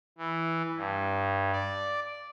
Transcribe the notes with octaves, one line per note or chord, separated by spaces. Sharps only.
E3
G2
D5